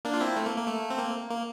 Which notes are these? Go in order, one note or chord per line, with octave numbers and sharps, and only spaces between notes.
A#3 D4
F4
C4 E4
A3
A#3
A#3
A3
C4
A#3
A#3